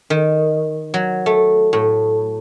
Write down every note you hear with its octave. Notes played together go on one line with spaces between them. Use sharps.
D#3
F#3
A3
A2